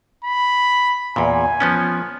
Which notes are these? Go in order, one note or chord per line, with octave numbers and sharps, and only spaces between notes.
B5
E2 A#2 G#5
F3 B3 C#4